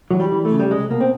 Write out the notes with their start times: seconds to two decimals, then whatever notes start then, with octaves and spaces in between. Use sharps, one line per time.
0.11 E3 F#3
0.20 G3
0.32 E3
0.45 A3
0.52 C#3
0.60 G3
0.70 C2 G#3
0.90 B2 A#3
1.00 C4